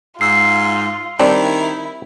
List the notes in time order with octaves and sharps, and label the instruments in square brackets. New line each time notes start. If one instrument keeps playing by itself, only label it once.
[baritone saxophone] G#2 [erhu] F4 [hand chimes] E6 C7
[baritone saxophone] D#3 [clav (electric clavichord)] G3 C4 D4 [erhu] E4